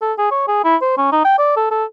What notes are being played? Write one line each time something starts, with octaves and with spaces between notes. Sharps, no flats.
A4
G#4
C#5
G#4
E4
C5
C#4
D#4
G5
D5
A4
A4